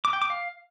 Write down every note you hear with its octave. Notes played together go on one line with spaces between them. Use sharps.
D6
G5
D6
F5